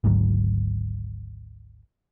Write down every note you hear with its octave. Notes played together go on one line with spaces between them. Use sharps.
G#1 D2 G#2 F#3